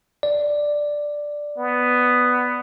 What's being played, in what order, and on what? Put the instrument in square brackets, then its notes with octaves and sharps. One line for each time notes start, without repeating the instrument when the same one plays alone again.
[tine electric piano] D5
[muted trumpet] B3